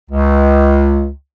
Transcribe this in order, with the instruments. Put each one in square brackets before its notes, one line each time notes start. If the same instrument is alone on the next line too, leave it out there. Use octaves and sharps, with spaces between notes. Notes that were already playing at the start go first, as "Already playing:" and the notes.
[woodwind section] C#2